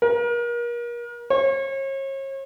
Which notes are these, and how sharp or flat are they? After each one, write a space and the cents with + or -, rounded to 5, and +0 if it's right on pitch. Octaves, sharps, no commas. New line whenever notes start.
A#4 +35
C#5 -40